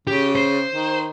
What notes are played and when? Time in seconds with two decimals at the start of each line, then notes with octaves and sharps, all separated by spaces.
0.07 C#3 G4
0.36 C5
0.71 D#3